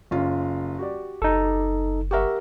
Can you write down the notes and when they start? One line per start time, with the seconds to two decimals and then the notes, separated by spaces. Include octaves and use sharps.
0.11 F#1 C#4 F4
0.79 F#4 G4 D5
1.22 F#1 D#4 A4
2.11 G4 A#4 E5 F#5 C#6